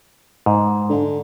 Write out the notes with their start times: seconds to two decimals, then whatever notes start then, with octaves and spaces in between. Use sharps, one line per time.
0.46 G#2
0.89 D3